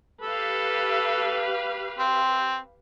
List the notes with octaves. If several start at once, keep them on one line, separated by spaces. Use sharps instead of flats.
G4 A4 B4 F5
C4